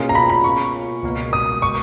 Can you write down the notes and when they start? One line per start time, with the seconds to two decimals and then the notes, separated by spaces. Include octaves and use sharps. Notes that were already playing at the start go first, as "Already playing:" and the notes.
Already playing: B2 A#3 C#4 F4 G#4
0.09 A#5
0.15 B5
0.30 B5
0.44 C#6
1.03 C#2 B2 A#3
1.33 D#6
1.62 C#6